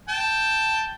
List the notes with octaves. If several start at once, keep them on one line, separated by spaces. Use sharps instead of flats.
G5 A5